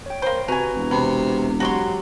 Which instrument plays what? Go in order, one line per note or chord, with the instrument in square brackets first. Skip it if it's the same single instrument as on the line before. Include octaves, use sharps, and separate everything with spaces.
[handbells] C#5 G5
[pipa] A#3 C5
[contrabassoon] C3 [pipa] C#4 G#5 [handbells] F#4 B4 A#5
[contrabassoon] E1
[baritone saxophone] C3 [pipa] B3
[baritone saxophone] F#3 [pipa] F#4 C#5 C6 [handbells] G4